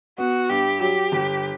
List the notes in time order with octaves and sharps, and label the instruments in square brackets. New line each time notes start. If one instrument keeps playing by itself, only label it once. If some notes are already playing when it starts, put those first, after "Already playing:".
[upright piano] B3 [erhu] F#4
[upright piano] G2 [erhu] G4
[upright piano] F#3 [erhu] G4
[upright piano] G1